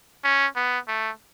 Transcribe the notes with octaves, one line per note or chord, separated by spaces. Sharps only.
C#4
B3
A3